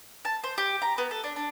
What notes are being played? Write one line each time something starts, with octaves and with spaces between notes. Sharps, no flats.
A5
C5
G4
A#5
B3
A4
D4
D4